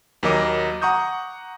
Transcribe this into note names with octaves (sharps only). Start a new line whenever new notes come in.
D#2 F#3 A#4 D#5 D6
F#5 A#5 C#6 D#6 G6